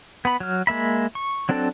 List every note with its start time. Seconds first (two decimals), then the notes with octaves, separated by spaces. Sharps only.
0.25 B3 B5
0.40 F#3 F6
0.67 G#3 A#3 E5 B5
1.15 C#6
1.49 F#3 C4 D4 A4 A5